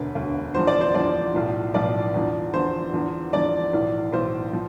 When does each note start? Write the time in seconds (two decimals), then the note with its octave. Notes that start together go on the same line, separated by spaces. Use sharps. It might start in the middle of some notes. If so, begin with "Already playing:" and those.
Already playing: E1 D2 D3 B4
0.15 E1 D2 D3
0.54 E2 D3 F3 C5
0.67 D5
0.81 C5
0.94 E2 D3 F3 D5
1.34 B1 A2 F3
1.74 B1 A2 F3 D5
2.14 E2 D3 F3
2.54 E2 D3 F3 C5
2.93 E2 D3 F3
3.33 E2 D3 F3 D5
3.73 B1 A2 E3
4.12 B1 A2 E3 C5
4.53 F3